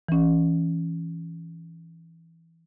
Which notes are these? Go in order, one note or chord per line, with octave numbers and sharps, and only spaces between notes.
E3 C#4